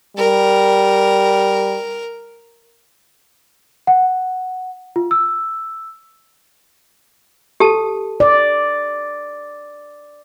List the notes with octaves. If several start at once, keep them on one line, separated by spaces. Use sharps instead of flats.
G3 A#4
F#5
F4
E6
G4 A4 A5
D5